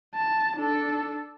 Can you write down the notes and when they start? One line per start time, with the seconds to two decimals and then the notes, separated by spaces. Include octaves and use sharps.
0.15 A5
0.57 D4 A4